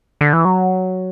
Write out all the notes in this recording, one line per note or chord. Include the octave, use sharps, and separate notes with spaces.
D3
E3
F#3